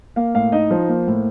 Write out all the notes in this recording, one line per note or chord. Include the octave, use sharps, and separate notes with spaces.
A#3 F5
A2 F5
D#4 D#5
F3 C5
A#3
A2